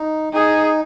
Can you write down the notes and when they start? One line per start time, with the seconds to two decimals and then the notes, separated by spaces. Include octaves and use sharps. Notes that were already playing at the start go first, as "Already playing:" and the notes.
Already playing: D#4
0.33 D#4 G#4